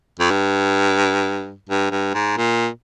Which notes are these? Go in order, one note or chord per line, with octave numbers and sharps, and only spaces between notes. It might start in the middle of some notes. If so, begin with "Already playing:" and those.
F2
G2
G2
G2
G#2
A#2